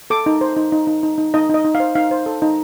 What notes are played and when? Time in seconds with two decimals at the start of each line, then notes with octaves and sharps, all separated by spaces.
0.10 A4 D6
0.26 D#4
0.41 C5
0.57 D#4
0.72 D#4
0.87 D#4
1.03 D#4
1.18 D#4
1.34 D#4 D#5
1.49 D#4 D#5
1.65 D#4
1.75 F5
1.80 C5
1.95 D#4 F5
2.11 C5
2.26 A4
2.42 D#4